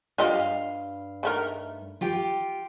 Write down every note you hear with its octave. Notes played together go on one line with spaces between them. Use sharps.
G2 F4 G4 D#5 F5
D#3 A3 A#4
F4 G4 G5